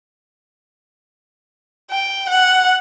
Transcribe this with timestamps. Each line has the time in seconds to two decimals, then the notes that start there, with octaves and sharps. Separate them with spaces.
1.91 G5
2.30 F#5